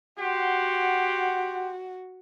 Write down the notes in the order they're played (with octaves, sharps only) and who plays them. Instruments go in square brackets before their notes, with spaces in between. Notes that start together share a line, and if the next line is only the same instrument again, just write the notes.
[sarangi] F#4 [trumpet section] G4 F#5 C6